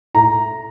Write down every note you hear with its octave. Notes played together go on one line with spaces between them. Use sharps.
A2 A#5